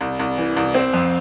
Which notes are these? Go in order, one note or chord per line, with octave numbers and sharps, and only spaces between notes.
C2
C2
E3
C2
C4
F2